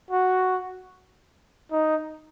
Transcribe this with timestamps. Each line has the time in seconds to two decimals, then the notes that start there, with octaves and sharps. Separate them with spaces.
0.11 F#4
1.71 D#4